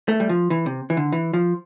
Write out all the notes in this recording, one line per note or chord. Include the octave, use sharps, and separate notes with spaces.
A3
G3
F3
E3
C3
E3
D3
E3
F3